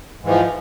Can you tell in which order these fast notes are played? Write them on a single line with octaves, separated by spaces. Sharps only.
G#2 E3 F3